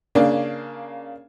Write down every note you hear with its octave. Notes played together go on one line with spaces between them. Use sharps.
C#3 A#3 D4